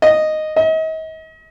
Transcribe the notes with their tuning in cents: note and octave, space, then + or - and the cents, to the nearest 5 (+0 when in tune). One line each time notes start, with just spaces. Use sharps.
D#5 -5
D#5 +40